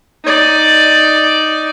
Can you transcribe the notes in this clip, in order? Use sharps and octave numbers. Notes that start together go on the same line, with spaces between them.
D#4 D5